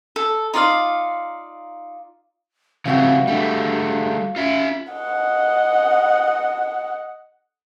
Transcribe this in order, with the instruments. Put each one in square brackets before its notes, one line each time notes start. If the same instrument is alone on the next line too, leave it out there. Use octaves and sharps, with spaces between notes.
[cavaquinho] A4
D#4 F4 D5 F5
[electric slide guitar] C#3 F3 G3 [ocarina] C4 [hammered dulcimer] F#4 E5 F5
[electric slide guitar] G3 A3 [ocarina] D4 [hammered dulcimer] B5
[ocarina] C#4 [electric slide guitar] F4 E5
[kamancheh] D#5 F#5